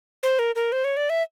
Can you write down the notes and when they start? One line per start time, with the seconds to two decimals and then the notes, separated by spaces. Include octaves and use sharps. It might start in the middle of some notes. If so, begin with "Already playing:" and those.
0.23 C5
0.39 A#4
0.55 A#4
0.72 C5
0.84 C#5
0.97 D5
1.10 E5